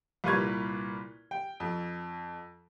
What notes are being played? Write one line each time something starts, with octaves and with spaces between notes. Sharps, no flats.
C2 A#2 F4 B4 C#6 G#6
G5
F2